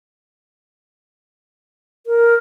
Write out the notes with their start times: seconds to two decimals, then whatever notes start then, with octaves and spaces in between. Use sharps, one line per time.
2.07 A#4